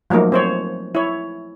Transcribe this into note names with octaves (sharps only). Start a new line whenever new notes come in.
F3 F#3 A3 A#3 D#4
C4 C5 C#5
E4 C#5